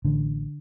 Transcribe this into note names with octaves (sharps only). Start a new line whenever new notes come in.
A1 D3